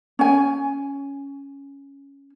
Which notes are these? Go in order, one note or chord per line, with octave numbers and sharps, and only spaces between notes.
C#4 G#5